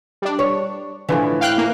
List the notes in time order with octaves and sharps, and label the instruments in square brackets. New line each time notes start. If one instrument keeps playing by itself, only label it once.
[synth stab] G3 D4
[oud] C#5
[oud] A2 E3 [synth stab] D3 F3
[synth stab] F5 G5 F#6
A#3